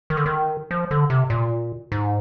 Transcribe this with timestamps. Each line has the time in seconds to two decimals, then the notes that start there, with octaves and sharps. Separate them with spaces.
0.10 D#3
0.17 D3
0.26 D#3
0.71 F3
0.91 D3
1.10 C3
1.30 A#2
1.92 G#2